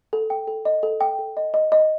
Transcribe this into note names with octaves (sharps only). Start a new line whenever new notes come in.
A4
G5
A4
D#5
A4
G5
A4
D#5
D#5
D#5